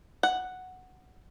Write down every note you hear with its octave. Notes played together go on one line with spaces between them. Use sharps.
F#5